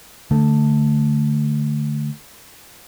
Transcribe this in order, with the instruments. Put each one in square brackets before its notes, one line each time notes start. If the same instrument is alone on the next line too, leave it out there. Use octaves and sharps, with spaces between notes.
[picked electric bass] D3 A3